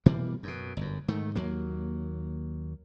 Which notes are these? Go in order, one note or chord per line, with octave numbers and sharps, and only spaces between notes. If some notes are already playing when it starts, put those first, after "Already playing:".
B2 E3 G3 A#3
F#2 B2
G1 F#2
G#2 D#3 A3
D#2 F#3 A#3